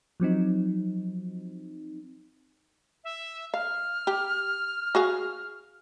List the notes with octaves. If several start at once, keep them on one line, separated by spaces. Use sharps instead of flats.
F3 F#3 C4 D#4
E5
F5 F6
G4
F#4 G#4 F5